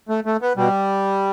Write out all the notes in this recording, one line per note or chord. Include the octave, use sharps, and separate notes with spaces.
A3
A3
B3
B2 G3